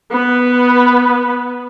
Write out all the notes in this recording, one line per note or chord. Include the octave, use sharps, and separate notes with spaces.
B3 B4